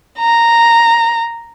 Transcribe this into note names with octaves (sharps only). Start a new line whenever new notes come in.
A#5